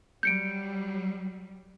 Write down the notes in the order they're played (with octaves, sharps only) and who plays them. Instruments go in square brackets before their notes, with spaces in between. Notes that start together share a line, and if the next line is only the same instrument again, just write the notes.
[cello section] F#3 G3 [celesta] G6 C#7 D7